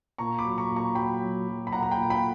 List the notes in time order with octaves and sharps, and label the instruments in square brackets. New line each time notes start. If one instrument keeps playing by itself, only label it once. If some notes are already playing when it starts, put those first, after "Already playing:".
[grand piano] A#2 A#5 C#6
B5 D6
F#3
A#5 C#6
A#2
A#5 C#6
F#3 G5 B5
F#3
F#3
B5
A#2 F#5 A#5
A#5
G5 B5
A#2
G5 B5